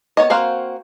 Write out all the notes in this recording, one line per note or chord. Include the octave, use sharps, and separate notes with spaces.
B3 C#5 D#5
A#3 C4 F#4 C5 F5